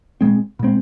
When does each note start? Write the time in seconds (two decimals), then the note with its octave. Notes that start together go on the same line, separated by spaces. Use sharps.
0.21 A#2 G#3 C4
0.59 A#2 G#3 C4